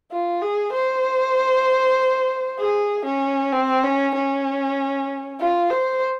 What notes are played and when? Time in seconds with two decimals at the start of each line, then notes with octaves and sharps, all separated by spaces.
0.11 F4
0.42 G#4
0.72 C5
2.59 G#4
3.05 C#4
3.52 C4
3.84 C#4
4.15 C#4
5.40 F4
5.70 C5